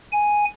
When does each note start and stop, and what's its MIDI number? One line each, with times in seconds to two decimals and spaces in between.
0.12 0.45 80